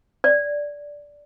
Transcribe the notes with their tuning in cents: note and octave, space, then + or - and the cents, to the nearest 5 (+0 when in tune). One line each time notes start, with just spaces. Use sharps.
D5 -10